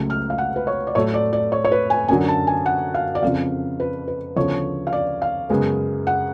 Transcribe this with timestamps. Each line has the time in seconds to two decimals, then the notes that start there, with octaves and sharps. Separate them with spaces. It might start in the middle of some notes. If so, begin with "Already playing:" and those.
Already playing: C#2 C#3 F#3 A3
0.10 F6
0.30 F5
0.38 F#5
0.56 B4
0.67 C#5
0.87 D5
0.95 A2 F#3 A3 C#5
1.14 D5
1.33 D5
1.52 C#5
1.65 C#5
1.72 B4
1.90 G#5
2.08 F#2 D3 F#3 G#5
2.28 A5
2.47 G#5
2.66 F#5
2.94 F5
3.15 D5
3.23 F2 C#3 F3 F5
3.80 B4
4.08 B4
4.36 D2 C#3 F3 B3 C#5
4.87 F5
4.93 D5
5.22 F5
5.50 F#2 C#3 G#3 B3
6.07 F#5